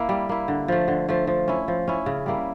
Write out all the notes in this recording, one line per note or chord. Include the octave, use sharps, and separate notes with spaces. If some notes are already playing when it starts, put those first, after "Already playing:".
Already playing: A#3 E4
G3
A#3 E4
D3
F3 A3
D3
F3 A3
F3
C#4 E4
F3
C#4 E4
C#3
G3 A#3 E4